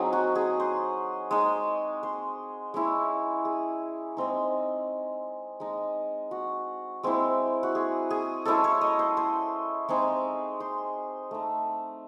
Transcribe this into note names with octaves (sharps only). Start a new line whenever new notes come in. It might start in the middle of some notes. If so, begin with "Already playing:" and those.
Already playing: F#3 C4 D#4 G#4
F#4
G#4
C5
G#3 D#4
C5
G#3 C#4 E4
G#4
G#3 C4 D#4
G#3 D#4
F#4
G#3 C4 E4
F#4
G#4
G#4
G#3 C#4 E4 A4
C#5
D#5
C5
C5
G#3 C4 D#4 G#4
C5
A3 D#4